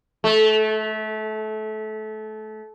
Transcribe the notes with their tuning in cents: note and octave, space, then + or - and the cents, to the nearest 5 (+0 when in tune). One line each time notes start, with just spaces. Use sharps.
A3 -25